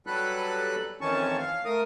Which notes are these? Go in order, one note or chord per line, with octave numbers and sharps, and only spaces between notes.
F#3 G3 A4 B4 F#6
F2 D#3 E3 C#4 A5 C#6
F5
A3 A#4 D#6